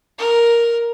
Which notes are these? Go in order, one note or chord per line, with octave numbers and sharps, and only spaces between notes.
A#4